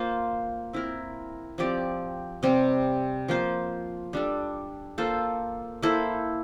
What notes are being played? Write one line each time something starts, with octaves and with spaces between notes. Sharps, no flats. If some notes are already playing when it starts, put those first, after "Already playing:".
Already playing: A#3 F4 C5
C4 E4 A#4
F3 C4 G4 D5
C3 G3 C4
F3 A#3 F4 C5
G3 D4 A4
A#3 F4 A4 C5
A#3 E4 A4 C5